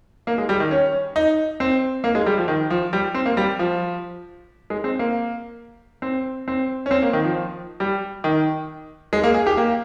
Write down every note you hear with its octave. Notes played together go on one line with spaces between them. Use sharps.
A#3
G#3
G3
D#3
C#4
D#4
C4
A#3
G#3
G3
F3
D#3
F3
G3
C4
A#3
G3
F3
G#3
C4
A#3
C4
C4
C#4
C4
A#3
D#3
F3
G3
D#3
G#3
A#3
G#4
G4
A#3